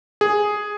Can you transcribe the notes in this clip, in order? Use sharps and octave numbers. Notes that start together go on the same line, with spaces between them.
G#4